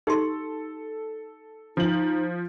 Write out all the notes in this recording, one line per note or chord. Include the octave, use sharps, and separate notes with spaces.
D#4 G4 A4 C6
F3 D#4 F#7